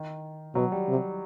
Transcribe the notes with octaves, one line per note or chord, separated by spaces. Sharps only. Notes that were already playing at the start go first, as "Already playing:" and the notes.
Already playing: D#3
B2 F#3
G3
C3